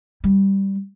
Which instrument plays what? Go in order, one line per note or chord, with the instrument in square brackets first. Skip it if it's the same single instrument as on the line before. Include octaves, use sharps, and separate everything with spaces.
[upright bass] G3